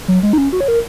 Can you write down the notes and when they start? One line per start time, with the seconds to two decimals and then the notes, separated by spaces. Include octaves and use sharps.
0.08 F#3
0.23 G#3
0.33 D#4
0.38 C#4
0.53 F#4
0.61 C#5
0.68 A#4